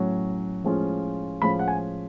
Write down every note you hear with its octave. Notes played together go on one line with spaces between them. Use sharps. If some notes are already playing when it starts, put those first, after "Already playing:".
Already playing: A2 F#3 C#4
A2 F3 G#3 C#4 F4
A2 F3 G#3 C#4 F4 B5
F#5
G#5